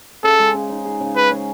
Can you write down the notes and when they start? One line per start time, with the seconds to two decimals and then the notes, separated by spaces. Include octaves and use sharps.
0.24 C#3 A4
0.39 G#3
0.54 C#3
0.70 D#4
0.85 G#4
1.01 C#3
1.16 G#4 B4
1.31 C#4